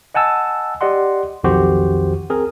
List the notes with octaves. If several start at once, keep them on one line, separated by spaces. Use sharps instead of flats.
D#5 F#5 G#5 A5 E6
G4 D5 D#5 F#5 C6
B1 F2 D#3 F#4 G4 C5
C4 G#4 A#4